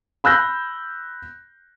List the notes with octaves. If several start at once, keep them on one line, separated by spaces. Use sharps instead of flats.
B5 E6 F#6 G6 A#6